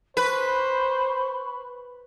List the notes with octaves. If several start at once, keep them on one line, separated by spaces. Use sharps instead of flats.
B4 C5 B5 C#6